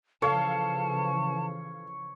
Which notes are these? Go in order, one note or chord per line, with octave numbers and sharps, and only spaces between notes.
C#3 E3 F3 A4 C#5 F5 A5